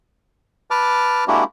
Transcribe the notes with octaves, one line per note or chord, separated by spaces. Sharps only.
B4 A5 D6 F6
G#3 A#3 D4 E4 F#4 G4